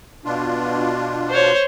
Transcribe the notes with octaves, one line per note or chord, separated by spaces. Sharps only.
B2 D4 F4
C5 C#5